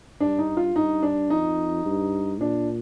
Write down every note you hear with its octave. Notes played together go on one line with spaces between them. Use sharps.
G2 D4
D#4
F4
G2 D#4
D4
F2 D#4
G2
A#2 D4